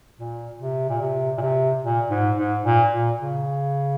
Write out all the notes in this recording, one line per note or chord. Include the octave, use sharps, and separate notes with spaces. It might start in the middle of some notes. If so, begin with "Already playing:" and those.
A#2
C3
A#2
C3
A#2
C3
A#2
G#2
G#2
A#2
A#2
C#3